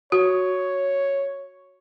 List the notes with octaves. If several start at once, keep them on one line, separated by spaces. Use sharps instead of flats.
F#4 C#5